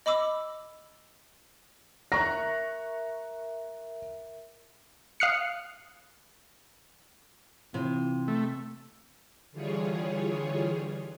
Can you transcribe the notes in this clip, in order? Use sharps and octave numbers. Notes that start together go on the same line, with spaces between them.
D#5 B5 D6 E6
A#4 E5 A#5 C#6 F#6 A#6
F5 D#6 F6 F#6 C7 C#7
C3 E3 F4
A3
D3 E3 G3 F4 G#4 C#5